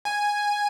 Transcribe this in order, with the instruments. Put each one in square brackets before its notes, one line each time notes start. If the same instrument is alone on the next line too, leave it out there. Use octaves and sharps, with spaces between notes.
[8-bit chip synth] G#5